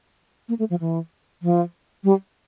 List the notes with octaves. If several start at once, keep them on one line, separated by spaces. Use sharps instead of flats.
A#3
A3
F3
E3
F3
G3